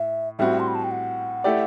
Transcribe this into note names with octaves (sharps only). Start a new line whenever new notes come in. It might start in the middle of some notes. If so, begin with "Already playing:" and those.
Already playing: A2 E5
A2 G3 C4 F#4 E5
C6
B5
A5
G5
F#5
A3 E4 G4 D5